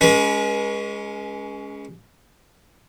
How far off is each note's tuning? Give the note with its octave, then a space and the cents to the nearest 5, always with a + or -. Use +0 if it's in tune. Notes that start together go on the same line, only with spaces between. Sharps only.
G#3 +0 C#4 +20 B4 -45